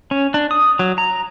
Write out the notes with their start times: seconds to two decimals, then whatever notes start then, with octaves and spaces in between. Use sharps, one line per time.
0.11 C#4
0.34 D4
0.51 D#6
0.79 F#3
0.98 A#5